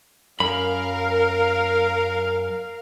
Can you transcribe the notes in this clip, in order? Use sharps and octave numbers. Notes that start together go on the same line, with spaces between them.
F#2 A#4 F5 B5